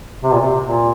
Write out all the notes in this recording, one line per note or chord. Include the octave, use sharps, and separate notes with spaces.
C3
A#2
C3
A#2